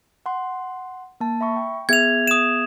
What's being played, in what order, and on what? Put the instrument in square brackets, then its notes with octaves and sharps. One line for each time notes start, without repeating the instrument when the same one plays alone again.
[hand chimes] F#5 C6
A#3 A5
E5 B5 C#6
G5
[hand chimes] B3 G#4 E5 [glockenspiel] G#6 F7
[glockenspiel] D#6 E7